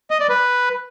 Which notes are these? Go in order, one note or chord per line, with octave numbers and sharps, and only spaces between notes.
D#5
D5
B4